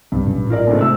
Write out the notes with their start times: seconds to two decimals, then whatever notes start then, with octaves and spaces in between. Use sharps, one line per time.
0.12 C2 G2 F#3
0.26 A1 A#2 C#4
0.50 F4 A#4 D5
0.67 C#2 G#2 A3 D4
0.80 C3 E6